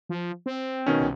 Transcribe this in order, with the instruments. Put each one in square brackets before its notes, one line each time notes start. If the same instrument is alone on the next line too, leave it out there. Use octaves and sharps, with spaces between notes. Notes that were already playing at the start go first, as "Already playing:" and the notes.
[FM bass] F3
C4
[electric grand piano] B2 D#3 C#4
[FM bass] C2